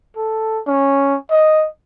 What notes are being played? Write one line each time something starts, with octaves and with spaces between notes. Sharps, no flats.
A4
C#4
D#5